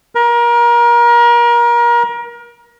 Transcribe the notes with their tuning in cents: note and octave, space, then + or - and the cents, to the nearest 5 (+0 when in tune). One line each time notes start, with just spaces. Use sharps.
A#4 +30